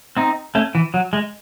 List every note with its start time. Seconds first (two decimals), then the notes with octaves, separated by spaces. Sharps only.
0.17 C4 D#4
0.55 A3 C#4
0.75 E3
0.94 F#3
1.13 G#3